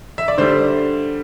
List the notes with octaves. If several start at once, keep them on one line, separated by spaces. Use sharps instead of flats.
E5
D5
D3 G3 C5